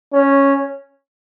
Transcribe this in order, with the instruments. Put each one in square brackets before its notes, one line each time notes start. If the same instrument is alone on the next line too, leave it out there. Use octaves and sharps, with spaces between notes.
[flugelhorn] C#4